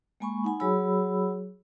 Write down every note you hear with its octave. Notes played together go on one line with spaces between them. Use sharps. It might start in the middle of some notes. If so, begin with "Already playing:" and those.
G#3 A#3 G#5 B5 C#6
D#4 F#5 G#5 B5
F#3 F#4 G#4 C#5 B5 E6